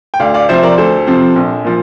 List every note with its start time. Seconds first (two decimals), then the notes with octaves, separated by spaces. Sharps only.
0.14 G5
0.19 D2 D5 F5
0.34 D5 F5
0.49 C3 F3 C4 C5 E5
0.63 A#4 D5
0.78 D2 A4 C5
1.07 C3 F3 C4
1.35 A#1
1.64 A#2 F3